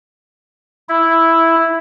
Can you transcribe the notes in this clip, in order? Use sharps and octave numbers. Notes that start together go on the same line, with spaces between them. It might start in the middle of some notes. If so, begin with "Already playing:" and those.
E4